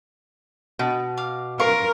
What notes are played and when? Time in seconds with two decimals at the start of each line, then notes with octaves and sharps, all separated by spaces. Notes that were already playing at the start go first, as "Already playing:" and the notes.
0.79 B2
1.18 F5 D6
1.60 F4 A#4 F5 C#6